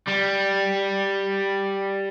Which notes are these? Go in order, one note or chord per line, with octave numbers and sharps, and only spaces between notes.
G3